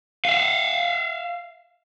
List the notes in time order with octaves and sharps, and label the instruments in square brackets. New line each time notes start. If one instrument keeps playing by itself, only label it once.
[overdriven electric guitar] E5 F5